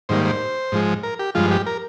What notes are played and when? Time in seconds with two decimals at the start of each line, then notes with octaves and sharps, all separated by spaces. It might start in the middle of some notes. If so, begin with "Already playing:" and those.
0.09 G#2 D#3 G3 A#3 C5
0.25 C5
0.72 G#2 F3 G#3
1.03 A#4
1.19 G4
1.35 G2 F3 G#3 F4
1.51 G4
1.66 A#4